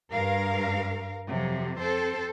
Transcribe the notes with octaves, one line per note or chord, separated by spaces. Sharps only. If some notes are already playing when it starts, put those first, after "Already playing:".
G2 A#4 F5
F2 C3 F3 F#3
C4 A4 C5